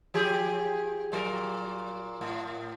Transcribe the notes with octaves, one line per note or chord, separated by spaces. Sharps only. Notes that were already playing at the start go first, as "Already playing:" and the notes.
F3 G4 G#4
A#2 F#3 A#4
A2